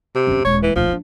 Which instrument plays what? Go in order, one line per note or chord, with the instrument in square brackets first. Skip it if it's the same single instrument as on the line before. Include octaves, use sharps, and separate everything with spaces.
[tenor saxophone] C3
[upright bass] F#2 F#3
[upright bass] D#1 G#3 [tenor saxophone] C#5
[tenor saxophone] E3
[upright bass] D#1 D2 [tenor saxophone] F3
[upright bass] D4 E4